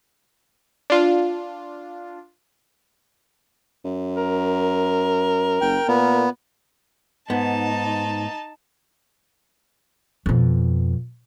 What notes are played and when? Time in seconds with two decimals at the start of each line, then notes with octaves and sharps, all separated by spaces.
0.90 D4 F4
3.84 F#2
4.16 A#4
5.61 F#1 G5
5.88 A#2 B3
7.30 G#2 B3 D#4 A5
10.26 F2 B2